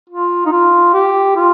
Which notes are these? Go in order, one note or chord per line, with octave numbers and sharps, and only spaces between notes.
F4
D#4
F4
G4
F4